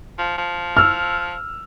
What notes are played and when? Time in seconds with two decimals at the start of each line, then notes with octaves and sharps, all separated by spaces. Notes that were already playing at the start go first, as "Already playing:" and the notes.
0.18 F3
0.38 F3
0.77 E6 F6